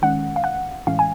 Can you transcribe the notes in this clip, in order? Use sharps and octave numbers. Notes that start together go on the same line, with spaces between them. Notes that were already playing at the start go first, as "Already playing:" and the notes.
D#3 G#3 C#4 F#5
F5
F#5
A2 E3 G#3 C#4 F5
G#5